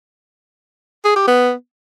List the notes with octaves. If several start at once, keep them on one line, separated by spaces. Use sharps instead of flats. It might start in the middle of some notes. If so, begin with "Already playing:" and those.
G#4
G4
B3